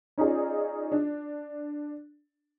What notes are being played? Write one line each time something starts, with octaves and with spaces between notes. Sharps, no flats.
C#4 D#4 F4 G#4 D5
D4